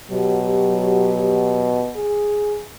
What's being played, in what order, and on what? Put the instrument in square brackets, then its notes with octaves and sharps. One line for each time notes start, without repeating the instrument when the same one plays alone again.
[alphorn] B2 [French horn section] F#3 G4
[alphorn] G#4